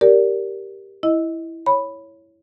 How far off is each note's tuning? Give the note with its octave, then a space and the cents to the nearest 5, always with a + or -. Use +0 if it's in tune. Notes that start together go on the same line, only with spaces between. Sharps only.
G4 +0 A#4 +0 D5 -15
E4 +0 D#5 +15
C#5 +0 B5 +0